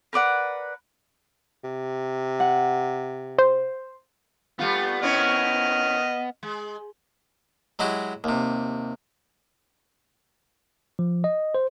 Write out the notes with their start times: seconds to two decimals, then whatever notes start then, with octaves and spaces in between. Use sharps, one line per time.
0.13 A#4 B4 D5 F#5
1.65 C3
2.40 F#5
3.39 C5
4.59 G3 A3 B3 F4
5.03 C4 C#4 E4 D#5 F6
6.43 G#3
7.79 F#3 G#3 E4 F#4 G4
8.24 D#2 C3
10.99 F3
11.24 D#5
11.55 C5